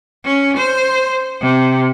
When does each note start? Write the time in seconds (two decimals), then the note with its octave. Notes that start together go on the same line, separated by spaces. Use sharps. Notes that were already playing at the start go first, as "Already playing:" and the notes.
0.25 C#4
0.57 C5
1.41 C3